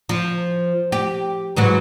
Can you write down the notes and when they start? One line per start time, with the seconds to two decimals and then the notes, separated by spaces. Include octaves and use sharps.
0.09 F3
0.92 G4
1.57 G#2 E3 F#3